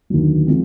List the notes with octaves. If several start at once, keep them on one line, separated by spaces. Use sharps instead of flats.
D#2 D3 F#3
F3 G#3 C4